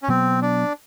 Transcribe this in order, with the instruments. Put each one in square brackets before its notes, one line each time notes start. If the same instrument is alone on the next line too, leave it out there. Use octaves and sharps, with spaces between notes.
[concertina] C#4
[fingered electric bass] B2 F#3 B3 [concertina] C4
[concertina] D4